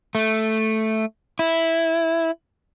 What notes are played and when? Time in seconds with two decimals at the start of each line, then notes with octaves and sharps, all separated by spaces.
0.15 A3
1.39 E4